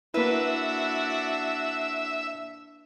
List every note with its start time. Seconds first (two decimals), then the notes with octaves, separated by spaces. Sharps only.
0.14 A#3 D4 E4 F#4 B4 E5